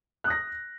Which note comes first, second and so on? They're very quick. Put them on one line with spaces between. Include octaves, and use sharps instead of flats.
F#6 D#6 A#6